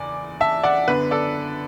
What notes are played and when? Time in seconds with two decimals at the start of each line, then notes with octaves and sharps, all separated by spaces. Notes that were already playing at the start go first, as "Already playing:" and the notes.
Already playing: F#1 E2 E3 D5
0.40 E5 A5
0.63 D5 F#5
0.88 F#2 D3 B3 D4 B4
1.11 A4 D5